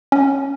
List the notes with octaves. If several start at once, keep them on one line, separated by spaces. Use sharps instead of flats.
C#4